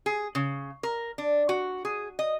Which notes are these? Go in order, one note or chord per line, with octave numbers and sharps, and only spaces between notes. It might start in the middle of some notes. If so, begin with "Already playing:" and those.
G#4
C#3
A#4
D4
F#4
G#4
D#5